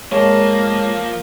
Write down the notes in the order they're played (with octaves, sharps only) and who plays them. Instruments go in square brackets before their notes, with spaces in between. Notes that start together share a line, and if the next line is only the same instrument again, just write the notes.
[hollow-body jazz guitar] G#2 G#3 [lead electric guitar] F3 A5 [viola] A#3 [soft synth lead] C#5